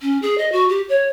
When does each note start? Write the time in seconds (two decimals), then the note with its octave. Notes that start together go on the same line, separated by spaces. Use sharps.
0.01 C#4
0.22 G#4
0.38 D#5
0.52 F#4
0.69 G4
0.89 C#5